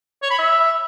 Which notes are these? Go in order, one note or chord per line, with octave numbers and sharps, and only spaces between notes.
C#5
B5
E5